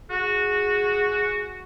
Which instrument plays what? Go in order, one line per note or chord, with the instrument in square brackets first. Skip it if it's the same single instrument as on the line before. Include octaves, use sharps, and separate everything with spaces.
[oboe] F#4 [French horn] G#4